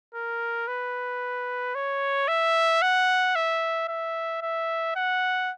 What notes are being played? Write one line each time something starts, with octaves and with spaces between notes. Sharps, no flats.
A#4
B4
C#5
E5
F#5
E5
E5
E5
F#5